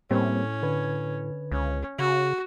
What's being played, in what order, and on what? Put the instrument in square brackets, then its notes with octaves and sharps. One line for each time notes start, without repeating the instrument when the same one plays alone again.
[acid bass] A2 [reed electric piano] G3 A#3 C4 [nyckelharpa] C#4
[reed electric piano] D3 B4 G#6
[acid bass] C#2 [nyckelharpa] C#4
[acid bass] C#3 [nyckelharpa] F#4